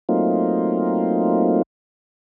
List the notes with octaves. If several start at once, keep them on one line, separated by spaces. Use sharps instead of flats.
F#3 A3 A#3 C4 D#4 F4